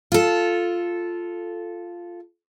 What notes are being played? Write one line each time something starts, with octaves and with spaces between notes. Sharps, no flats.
F4 A4